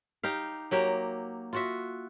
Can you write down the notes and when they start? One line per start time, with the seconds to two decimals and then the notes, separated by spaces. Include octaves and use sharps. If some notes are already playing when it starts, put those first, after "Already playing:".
0.23 D#4 G4 F5
0.71 F#3 A#3 G4
1.53 F4 F#4 E5